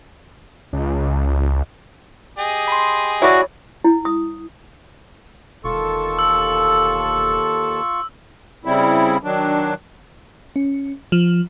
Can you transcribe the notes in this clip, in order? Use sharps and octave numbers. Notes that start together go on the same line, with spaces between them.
C#2
G4 G#4 D#5
B5 C6
E4 F#4 C#5 D5
E4
D#6
E1 D#2 F4 A4 C#6
E6
C#3 G3 C4 E4
D#3 F#3 D4
C#4
F3